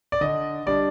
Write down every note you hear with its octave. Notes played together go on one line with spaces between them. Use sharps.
D5
D3 D#5
G3 D4 D5